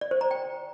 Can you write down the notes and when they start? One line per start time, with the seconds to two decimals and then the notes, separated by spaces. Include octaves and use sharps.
0.01 D5
0.11 C5
0.21 A#5
0.31 G5